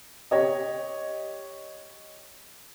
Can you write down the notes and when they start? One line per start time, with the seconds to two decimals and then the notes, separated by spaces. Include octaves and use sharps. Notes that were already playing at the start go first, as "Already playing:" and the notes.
0.31 G4 C#5 D#5